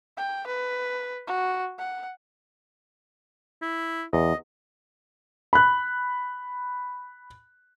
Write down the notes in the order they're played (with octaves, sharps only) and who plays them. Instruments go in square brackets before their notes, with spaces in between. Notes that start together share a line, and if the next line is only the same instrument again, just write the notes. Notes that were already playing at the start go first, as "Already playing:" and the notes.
[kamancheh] G5
B4
F#4
F#5
[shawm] E4
[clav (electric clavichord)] E2 [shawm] D#5
[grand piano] B5 F#6